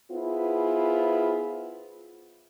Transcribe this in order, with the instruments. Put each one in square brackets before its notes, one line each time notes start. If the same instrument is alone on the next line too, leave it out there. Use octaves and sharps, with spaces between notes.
[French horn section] B3 E4 F4 G#4 C5